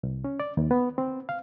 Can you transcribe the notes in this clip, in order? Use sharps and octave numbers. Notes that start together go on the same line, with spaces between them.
C2
C#4
D5
D#2
B3
C4
F5